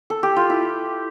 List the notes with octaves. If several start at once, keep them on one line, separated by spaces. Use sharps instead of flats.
A4
G4
F4
E4